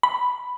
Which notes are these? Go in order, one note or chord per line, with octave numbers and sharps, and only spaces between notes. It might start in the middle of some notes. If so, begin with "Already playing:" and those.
B5